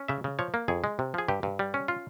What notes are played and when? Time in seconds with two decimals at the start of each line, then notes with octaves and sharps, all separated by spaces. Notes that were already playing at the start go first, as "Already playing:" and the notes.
Already playing: C#4
0.08 C#3 E5
0.24 C#3
0.39 F3 C#5
0.54 A#3
0.68 F2 G#4
0.84 G#3
0.99 C3
1.14 F3 G#4
1.28 G2 G4
1.43 G2
1.59 G3
1.74 C#4
1.88 F4